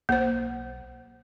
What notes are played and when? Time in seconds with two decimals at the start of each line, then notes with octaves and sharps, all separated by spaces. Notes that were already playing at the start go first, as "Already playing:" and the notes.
0.09 B1 A#3 C5